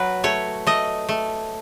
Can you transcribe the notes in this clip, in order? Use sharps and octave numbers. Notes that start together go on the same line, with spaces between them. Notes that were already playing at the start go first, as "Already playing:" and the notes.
Already playing: F#3 B4
A3 C#5
A3 D#5
A3